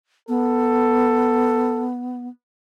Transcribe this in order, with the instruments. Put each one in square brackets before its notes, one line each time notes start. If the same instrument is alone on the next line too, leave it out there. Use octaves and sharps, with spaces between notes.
[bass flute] B3 [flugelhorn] A4